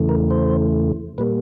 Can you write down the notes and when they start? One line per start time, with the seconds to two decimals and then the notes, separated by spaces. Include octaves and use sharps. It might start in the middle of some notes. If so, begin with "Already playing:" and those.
Already playing: E2 C#3 E3 A3
0.09 A#4
0.31 C5
1.18 A#2 G3 A#3 B4